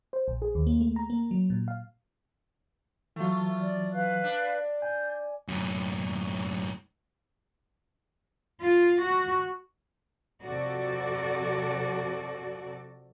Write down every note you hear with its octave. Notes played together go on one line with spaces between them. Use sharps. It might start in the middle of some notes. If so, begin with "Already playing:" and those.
C5
A#1
G#4
D#2
A#3
A3
A#5
A#3
F#3
A#2
F5
E3 F#3 A3 F4
D5
B4 F5 F#6
D4
G#5 G6
F#2 A2
F4
F#4
F2 C3 F#4 A4 D5